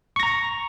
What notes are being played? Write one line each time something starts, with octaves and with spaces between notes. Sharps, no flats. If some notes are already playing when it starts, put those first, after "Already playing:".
A#5 C#6 A#6